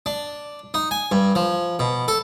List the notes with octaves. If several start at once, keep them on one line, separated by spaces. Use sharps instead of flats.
D4
D#4
G#5
G2
F3
B2
A4